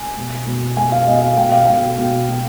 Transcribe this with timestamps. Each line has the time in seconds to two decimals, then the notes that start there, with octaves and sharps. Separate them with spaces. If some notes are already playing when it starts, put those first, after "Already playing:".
Already playing: G#5
0.17 B2
0.46 B2
0.77 B2 G#5
0.92 F5
1.07 B2 D#5
1.23 F5
1.37 B2 G5
1.52 F5
1.65 B2 G5
1.98 B2
2.29 B2